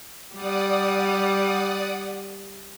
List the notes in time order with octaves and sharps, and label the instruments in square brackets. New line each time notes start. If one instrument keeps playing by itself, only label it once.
[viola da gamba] G3 [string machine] D5 F#5 D#6